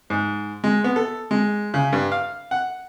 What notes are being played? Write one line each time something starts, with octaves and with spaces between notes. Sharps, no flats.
G#2
G#3
B3
A4
G#3
C#3
G2
F5
F#5